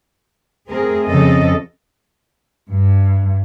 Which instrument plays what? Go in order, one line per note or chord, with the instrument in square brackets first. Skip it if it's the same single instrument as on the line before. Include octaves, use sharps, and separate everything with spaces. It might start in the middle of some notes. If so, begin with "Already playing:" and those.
[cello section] A3 C4 G#4 A#4
F2 C#3 C4 A4 D#5
[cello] G2